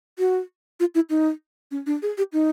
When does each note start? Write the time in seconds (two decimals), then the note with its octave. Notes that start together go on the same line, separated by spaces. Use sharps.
0.19 F#4
0.80 F4
0.95 E4
1.10 D#4
1.71 C#4
1.86 D4
2.02 G#4
2.18 G4
2.33 D#4